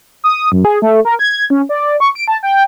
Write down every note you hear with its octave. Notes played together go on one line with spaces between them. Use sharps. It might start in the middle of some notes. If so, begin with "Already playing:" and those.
D#6
F#2
G#4
A3
A#4
G#6
C#4
D5
C#6
D7
A5
G5